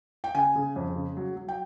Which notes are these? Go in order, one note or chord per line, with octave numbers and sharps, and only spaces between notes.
G5
C#3 G#5
C#3
F2
C#3
F#3
F#3
G5